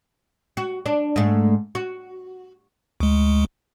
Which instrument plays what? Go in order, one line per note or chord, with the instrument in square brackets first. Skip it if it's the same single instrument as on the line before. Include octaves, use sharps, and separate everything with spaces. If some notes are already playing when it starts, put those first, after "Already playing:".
[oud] F#4
D4
G#2 A3
F#4
[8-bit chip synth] D2 G#3